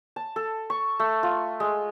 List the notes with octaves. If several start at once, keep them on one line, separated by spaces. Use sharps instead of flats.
A5
A4
C#6
A3
F4
G#3